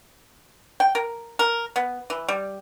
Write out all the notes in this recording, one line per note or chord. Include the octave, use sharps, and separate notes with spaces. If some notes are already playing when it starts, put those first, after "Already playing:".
G5
A#4
A#4
B3
E3
G3